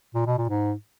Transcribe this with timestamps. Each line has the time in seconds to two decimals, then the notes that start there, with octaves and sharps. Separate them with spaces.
0.15 A#2
0.26 B2
0.38 A#2
0.49 G#2